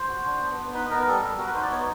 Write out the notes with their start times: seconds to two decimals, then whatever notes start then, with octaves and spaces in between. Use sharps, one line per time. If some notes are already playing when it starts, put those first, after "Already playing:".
Already playing: C5
0.09 F#4
0.25 D4
0.41 B3
0.58 B3
0.73 D#4 B4
0.90 B3 A#4
1.06 G3 A4
1.22 G3
1.38 F#4 A#4
1.46 B4
1.54 D#4 C5
1.62 D5
1.71 B3 C#5